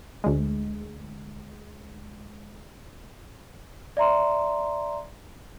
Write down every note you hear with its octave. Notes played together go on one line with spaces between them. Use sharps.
D2 G#3
D5 E5 A#5 C6